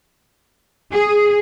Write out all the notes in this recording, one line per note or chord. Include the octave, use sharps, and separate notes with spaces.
G#4